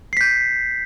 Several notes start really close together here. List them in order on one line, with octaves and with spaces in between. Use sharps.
C7 B6 G6